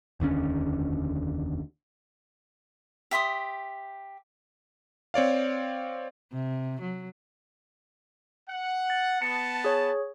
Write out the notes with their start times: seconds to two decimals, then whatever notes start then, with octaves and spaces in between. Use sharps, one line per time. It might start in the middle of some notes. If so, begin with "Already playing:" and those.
0.20 F1 D#2 D3 C#4
3.11 G4 E5 C6 D#6
5.14 C4 C#5 D5 F5
6.33 C3
6.81 F#3
8.49 F#5
8.90 A6
9.22 B3 A5 C#7
9.64 G#4 C#5